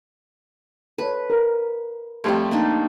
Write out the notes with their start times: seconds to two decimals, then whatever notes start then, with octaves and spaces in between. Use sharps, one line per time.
0.98 A4 B4 C#5
1.30 A#4
2.24 F2 G3 A3 G4 C5 C#5
2.51 A#3 D4 D#4